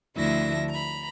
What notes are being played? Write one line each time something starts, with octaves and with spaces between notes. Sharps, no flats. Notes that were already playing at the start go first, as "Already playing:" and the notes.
D2 D3 F3 E4 E5 A#6
A#5 B5